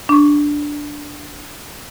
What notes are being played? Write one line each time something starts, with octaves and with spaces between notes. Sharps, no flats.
D4 C#6